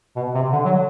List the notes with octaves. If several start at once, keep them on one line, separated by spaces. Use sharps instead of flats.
B2
C3
D3
F#3